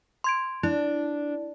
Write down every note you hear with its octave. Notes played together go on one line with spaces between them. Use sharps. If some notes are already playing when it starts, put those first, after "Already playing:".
C6 G#6 D7
D4 E4